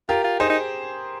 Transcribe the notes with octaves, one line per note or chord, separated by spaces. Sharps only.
F4 G4 A#4
F4
D#4 G#4 C5
D#4